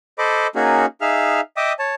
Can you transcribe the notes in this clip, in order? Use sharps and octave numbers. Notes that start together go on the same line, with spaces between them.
A4 C5 D#5 B5 D6
A#3 C#4 D#4 F#4 G#4
D#4 G#4 E5 F5 F6
D#5 E5 G5 D6 D#6
C#5 A5